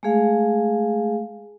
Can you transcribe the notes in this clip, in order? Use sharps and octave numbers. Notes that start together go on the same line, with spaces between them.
G#3 A3 G#4 F5